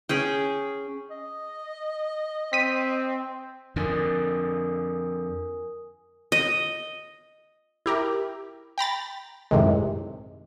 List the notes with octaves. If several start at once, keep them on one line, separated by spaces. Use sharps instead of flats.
C#4 G#4 G5
D#5
C4 B6 D#7
F2 D3 A#4 G#5 D#6
D#5
E4 G4 A#4
G5 A#5 B5 A6
F#2 A2 C3 D#3 G#3